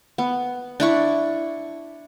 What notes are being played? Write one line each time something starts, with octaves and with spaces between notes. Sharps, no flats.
B3
D4 E4 C#6